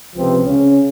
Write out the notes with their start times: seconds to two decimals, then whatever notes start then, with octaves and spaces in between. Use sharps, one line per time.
0.16 C#2 C3 F3 C4 B4
0.46 C#3 C#4